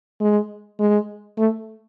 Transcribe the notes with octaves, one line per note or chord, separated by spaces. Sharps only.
G#3
G#3
A3